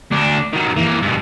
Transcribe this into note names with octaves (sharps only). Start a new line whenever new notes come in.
D2 D4
D#3 F#3
E3 A#3
G2 B2